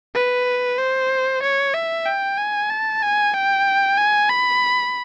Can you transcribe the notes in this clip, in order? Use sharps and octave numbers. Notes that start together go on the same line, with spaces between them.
B4
C5
C#5
E5
G5
G#5
A5
G#5
G5
G#5
B5